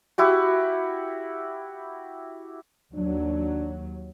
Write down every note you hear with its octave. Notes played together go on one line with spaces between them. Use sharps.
E4 F#4 G4
D#2 F#3 D4